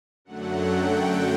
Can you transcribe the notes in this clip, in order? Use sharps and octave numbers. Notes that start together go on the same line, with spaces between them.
F#2 D3 F#3 A3 F#5
G5